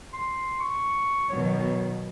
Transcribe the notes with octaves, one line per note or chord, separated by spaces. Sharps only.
C6
C#6
B2 D#3 F#3 C#5